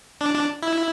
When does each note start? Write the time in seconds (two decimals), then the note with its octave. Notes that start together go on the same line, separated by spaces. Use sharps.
0.21 D4
0.35 D4
0.63 E4